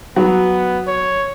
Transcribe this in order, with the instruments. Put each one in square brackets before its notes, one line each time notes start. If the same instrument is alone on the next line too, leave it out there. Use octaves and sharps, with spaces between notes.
[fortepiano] F#3 [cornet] B3
[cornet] C#5